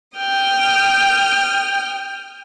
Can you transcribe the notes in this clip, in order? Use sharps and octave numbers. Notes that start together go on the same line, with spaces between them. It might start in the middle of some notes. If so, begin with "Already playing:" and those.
G5 D#6 F6